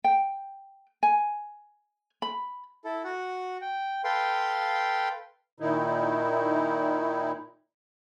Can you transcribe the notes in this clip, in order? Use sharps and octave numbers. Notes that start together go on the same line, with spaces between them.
G5
G#5
B5
E4 A4
F#4 F#5
G5
A4 B4 F5 G5 C6
A#2 D#3 D#4 E4